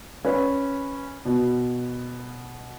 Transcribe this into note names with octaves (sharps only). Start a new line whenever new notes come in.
C#4 B4
B2